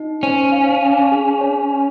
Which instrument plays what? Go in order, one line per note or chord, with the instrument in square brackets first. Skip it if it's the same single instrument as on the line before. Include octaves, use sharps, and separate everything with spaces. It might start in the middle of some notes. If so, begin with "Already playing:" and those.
Already playing: [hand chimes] D#4
[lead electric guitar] C#4 [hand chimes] C5
[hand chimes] F5
G#5
G#4
C#5
G#5